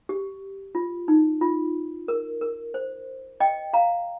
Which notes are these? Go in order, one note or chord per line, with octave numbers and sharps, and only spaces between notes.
G4
F4
D#4
F4
A#4
A#4
C5
D#5 G5
F5 A#5